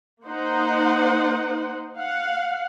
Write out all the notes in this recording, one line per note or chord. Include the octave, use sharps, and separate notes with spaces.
A#3 D#4 C5 F#5
F5 F#5